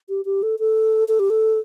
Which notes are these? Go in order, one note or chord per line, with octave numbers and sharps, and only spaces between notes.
G4
G4
A4
A4
A4
G4
A4